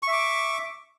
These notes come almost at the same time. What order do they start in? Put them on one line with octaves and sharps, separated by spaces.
C#6 E5 D6